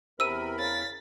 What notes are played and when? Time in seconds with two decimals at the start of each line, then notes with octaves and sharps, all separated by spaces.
0.20 E2 C3 A#4 B5 E6 D#7
0.59 C#3 A6 B6